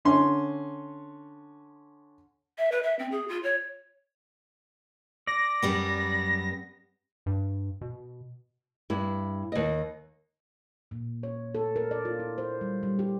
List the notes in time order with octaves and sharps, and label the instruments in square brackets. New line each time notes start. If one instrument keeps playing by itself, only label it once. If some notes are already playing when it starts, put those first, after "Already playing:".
[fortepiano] D3 C#4 C6
[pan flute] E5
B4
E5
C4
G#4
F4
C#5
[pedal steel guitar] D5 [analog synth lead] A#6
[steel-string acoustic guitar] F#2 G3 B3
[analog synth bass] G2
B2
[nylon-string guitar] G2 E4
D#2 D#5
[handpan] A#2
C#5
A4
A#4
D5
F4
E4
C5
G3
G3
G4